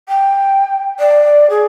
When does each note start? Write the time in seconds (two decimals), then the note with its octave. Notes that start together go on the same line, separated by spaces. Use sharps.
0.08 G5
0.99 D5
1.49 G#4